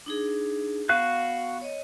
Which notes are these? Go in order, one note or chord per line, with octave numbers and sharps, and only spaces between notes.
D4 D#4 G#4
B3 F#4 F5 F#6
C#5 D#5